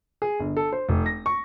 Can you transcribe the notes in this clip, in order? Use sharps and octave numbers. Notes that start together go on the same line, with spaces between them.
G#4
G1
A4
C5
F1
A#6
C#6